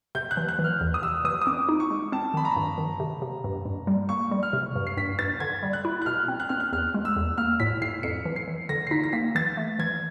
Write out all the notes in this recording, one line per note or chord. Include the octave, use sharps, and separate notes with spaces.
C3 G6
F#6
E3
F#6
E3
F6
E2
D#6
C3 E6
E3 D#6
D#6
C4 D6
D#4
C#6
G#3
C4 A5
D#3 B5
A#5
G2
D#3
C3
C3
G2
G2
G3
A#3 C#6
G3
F6
C3
G2
C7
G2 B6
G2 A6
D3 G#6
G3
F#6
E4
F#6
B2 F6
C4
F#6
C4 F6
F#6
E2 F6
G#3
E6
E2
A#3 F6
A2 B6
A2 C7
F2 C#7
E3
C7
E3
D3 A#6
C7
D#4 B6
A#6
A#3 B6
E3 A6
A3
E3 G#6